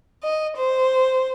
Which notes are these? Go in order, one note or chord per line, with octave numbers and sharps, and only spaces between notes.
D#5
C5